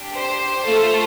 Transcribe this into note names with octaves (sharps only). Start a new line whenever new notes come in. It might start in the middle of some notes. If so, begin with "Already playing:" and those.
Already playing: D4 G4
C5
A3 F4 A4